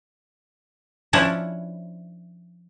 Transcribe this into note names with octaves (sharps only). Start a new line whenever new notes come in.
F3 C#4 D4 E4